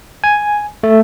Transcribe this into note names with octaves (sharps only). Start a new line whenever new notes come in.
G#5
A3